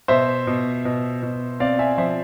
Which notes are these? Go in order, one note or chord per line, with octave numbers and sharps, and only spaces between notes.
B2 C5 E5
B2
B2
B2
C4 D5 F5
E5 G#5
F3 C5 E5